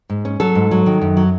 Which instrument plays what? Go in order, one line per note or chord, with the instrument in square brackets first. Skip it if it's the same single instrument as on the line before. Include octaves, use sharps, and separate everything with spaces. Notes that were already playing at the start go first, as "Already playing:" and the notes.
[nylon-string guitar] G#2
C#4
F#3 A4
G#2
F#3
D#3
F#2
F#3